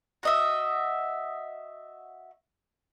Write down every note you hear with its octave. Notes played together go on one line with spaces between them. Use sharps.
F#4 D#5 E5